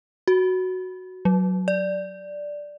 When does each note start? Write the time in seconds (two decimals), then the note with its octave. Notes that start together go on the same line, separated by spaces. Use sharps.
0.28 F#4
1.25 F#3
1.68 D5